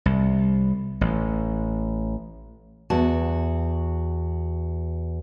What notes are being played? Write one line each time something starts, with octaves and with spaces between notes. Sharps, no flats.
C2
A1
E2 F#4 A5